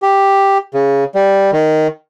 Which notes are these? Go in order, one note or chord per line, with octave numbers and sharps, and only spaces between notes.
G4
C#3
G3
D#3